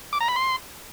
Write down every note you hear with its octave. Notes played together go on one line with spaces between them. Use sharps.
D6
A#5
B5
C6